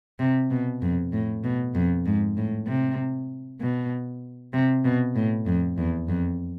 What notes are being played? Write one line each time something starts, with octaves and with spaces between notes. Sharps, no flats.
C3
B2
F2
A2
B2
F2
G#2
A2
C3
B2
C3
B2
A2
F2
E2
F2